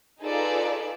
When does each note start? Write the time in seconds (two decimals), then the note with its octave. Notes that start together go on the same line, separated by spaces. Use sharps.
0.23 D#4 F4 G#4 A4 B4 D5